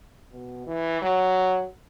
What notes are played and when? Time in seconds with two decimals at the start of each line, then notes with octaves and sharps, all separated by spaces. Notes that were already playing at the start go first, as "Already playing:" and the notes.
0.31 B2
0.67 E3
1.02 F#3